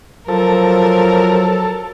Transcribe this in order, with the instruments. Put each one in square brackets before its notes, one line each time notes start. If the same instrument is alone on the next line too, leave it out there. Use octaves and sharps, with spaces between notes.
[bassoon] F3 [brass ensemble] F#3 [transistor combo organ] A4 [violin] A#4